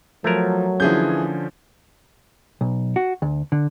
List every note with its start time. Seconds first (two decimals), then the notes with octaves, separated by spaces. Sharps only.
0.24 F3 F#3 A3 A#4 G#6
0.80 D3 E3 F3 C#4 G#4 G6
2.61 B1
2.96 F#4
3.22 D2
3.52 D3